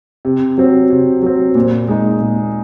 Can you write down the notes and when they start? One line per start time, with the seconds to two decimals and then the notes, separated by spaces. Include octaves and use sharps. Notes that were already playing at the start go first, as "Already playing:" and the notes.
0.25 C3
0.58 F#3 C4
0.90 C3
1.22 F#3 C4
1.55 A#2
1.88 G#3 D#4
2.21 A#2